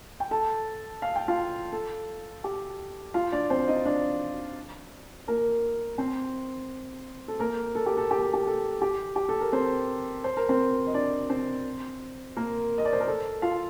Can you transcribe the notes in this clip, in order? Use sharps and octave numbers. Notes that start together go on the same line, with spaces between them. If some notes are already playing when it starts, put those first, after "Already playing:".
G5
A4 A5
F5
G5
F4 F5
A4
G4
F4 F5
D4 D5
C4 C5
D#4 D#5
D4 D5
A#3 A#4
C4 C5
A4
A#3 A#4
A4
G4
A4
G4
A4
G4
A4
G4
G4
A4
A#4
C4 C5
C5
A#4
C4 C5
D#5
D4 D5
C4 C5
A#3 A#4
D#5
D5
C5
A#4
A4
F4 F5